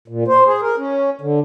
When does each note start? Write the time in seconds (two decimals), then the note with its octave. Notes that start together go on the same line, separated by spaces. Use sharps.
0.08 A#2
0.28 C5
0.46 G#4
0.61 A#4
0.78 C#4
1.21 D3